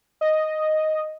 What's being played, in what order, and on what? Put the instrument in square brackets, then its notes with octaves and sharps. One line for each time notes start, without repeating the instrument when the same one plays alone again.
[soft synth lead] D#5